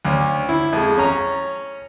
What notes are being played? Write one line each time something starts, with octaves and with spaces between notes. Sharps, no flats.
D2 C#4
E4
F2 G#3
C#4 A#5